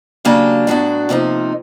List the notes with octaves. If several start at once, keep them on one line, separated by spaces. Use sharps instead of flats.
C#3 F#3 A#3 D4 G4
A2 F#3 B3 D4 F#4
C3 F3 A#3 D#4